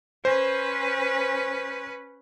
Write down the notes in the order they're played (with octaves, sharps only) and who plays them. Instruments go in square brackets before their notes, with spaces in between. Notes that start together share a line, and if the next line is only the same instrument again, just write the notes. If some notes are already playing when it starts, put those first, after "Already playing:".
[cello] C#4 B4 [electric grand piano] C5